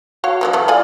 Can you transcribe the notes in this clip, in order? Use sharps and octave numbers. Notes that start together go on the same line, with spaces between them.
F#4 C#5 F5
F3 F#3 A#3
C#3 E3 A3
F4 D5 G#5